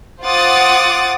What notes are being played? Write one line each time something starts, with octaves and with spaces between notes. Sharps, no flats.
F4 C5 F#5 D6 D#6 A6